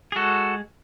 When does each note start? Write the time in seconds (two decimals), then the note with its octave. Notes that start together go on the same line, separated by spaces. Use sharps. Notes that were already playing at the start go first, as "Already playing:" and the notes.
0.12 G#4
0.16 G#3 F#4 A4